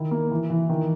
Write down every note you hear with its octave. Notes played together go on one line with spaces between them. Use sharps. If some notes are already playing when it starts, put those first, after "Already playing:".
Already playing: D#3 E4
A#3
E3
E3
D#3